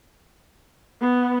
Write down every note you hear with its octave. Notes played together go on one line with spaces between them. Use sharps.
B3